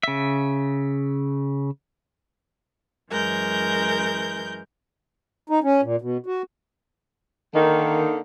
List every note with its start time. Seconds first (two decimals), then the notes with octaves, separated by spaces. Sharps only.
0.03 C#3 E5
3.11 F#2 E3 G#3 A#4 G6
5.50 D#4
5.64 C#4
5.83 A#2
6.02 B2
6.26 F#4
7.55 D3 D#3 A#3 D#4